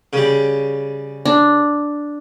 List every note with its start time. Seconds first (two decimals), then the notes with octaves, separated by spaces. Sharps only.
0.13 C#3 G3
1.25 D4